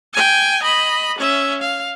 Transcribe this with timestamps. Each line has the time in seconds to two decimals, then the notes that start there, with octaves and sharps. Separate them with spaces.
0.13 G5 G#5
0.63 D#5 B5
1.19 C#4 E5
1.62 F5